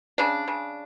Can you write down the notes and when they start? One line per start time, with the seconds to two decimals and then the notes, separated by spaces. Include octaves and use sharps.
0.18 C#3 D4
0.48 C#3